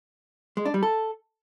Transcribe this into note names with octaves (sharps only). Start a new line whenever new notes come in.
G#3
D4
G3
A4